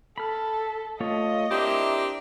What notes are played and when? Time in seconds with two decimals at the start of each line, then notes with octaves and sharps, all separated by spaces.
0.18 A4 B5 F6
1.00 A3 F4 C#5 D#5
1.51 C4 D4 E4 G4 A#4 E5